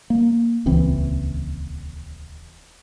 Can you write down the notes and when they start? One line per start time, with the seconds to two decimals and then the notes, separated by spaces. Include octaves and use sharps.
0.10 A#3
0.66 D#1 C#2 E3 C4